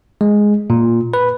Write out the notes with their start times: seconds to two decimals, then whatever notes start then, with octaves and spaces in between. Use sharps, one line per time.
0.21 G#3
0.70 A#2
1.14 B4